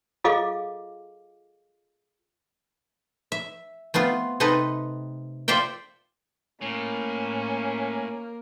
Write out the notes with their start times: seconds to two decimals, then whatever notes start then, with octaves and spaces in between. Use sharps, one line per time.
0.24 F4 G#4 A4 D#5 F5 D6
3.32 E5
3.94 A3 B3 C4 F4
4.40 C3 C4 D#4 A4 B4
5.48 F4 A4 C5 D5 E5 G5
6.62 A2 A#3 C#4